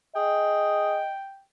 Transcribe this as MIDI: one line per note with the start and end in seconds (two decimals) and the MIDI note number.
0.16 1.00 68
0.16 1.13 75
0.16 1.42 79